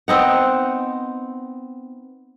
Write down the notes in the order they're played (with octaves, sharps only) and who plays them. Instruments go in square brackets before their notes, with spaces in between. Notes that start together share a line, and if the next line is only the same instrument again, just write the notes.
[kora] B3 C4 D#4 F#5